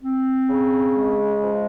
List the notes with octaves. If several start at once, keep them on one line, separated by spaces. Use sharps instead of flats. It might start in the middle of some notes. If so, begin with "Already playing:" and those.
C4
C#3
G#3
F3